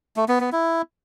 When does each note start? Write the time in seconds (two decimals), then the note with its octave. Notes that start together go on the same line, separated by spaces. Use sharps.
0.16 A3
0.28 B3
0.40 B3
0.52 E4